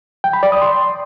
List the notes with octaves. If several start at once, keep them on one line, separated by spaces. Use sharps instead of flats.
G5
B5
D5
D#6
C6